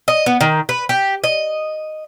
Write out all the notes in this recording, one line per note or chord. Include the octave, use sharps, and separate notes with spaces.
D#5
B3
D#3
B4
G4
D#5